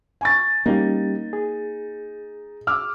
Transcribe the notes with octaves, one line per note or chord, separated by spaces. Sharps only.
G#5 C#6 A6
G3 A#3 C#4 D#4 G4
G#4
D6 E6 F6